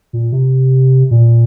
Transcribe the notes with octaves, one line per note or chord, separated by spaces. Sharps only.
A#2
C3
A#2